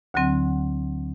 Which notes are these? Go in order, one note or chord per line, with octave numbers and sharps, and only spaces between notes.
D2 D3 F#3 C4